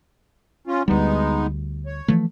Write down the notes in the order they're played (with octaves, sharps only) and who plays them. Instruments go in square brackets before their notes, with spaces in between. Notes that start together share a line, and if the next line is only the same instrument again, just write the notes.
[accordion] C#4 F4
[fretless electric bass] D2 G3 [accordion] G#3 B3 D#4
[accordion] C#5
[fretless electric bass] E3 F3 A3